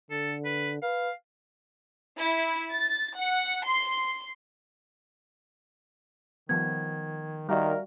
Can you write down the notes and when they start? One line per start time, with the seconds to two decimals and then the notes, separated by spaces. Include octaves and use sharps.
0.11 D3 A4
0.45 B4
0.82 B4 F5
2.16 E4
2.71 A6
3.15 F#5
3.64 C6
6.49 D#3 F3 G3 B3 G#6
7.49 D#3 G3 F#4 A#4 D5 E5 F5